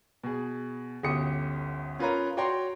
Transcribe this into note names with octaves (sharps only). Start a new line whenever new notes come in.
B2 G#4
G1 D2 C#4 G4 D#6 C#7
C#4 F4 A#4 B4 C#5 A#5
F#4 C#5 D5 G5 A#5 C6